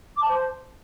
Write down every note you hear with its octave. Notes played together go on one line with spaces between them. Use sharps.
D6
A5
C5